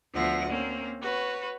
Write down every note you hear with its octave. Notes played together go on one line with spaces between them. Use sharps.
D2 F3 B3 E5 F#5 A#6
A#3 C4 C#4
F#4 B4 C#5